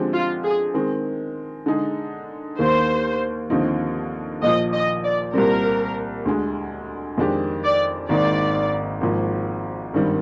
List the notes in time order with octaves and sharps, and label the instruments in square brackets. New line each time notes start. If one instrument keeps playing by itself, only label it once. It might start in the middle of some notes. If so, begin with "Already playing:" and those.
Already playing: [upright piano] D3 F3 G#3 C4 G4
[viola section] F4
G#4
[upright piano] D#3 G#3 C4
D3 G#3 D#4 G#4
[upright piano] D#2 D#3 A#3 [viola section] C5
[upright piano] D#2 D3 F3 C4 D#4
[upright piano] A#1 A#2 F3 [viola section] D#5
[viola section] D#5
D5
[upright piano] C2 A#2 G3 C4 [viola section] A#4
[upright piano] D2 D3 G#3
F2 D#3 G#3 D4 G4
[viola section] D5
[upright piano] G#1 G#2 D#3 A#3 D#4 [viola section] D5
[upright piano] G#1 G#2 F3 A#3
G#1 G2 D#3 G3 C4